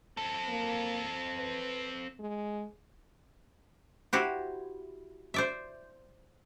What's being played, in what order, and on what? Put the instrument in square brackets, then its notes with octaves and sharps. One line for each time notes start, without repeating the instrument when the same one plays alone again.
[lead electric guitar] C4 A4
[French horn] A#3
B4
G#3
[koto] E4 F#4 G4 C5
C5 D5 E5